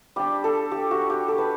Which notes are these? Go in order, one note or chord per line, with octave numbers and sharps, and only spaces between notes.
G3 D4 G4
A4
G4
F#4
G4
A4
B4